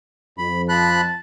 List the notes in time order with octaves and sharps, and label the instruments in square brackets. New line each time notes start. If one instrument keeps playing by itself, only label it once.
[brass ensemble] F2 [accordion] B5
[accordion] F3 B5 F#6 [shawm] A5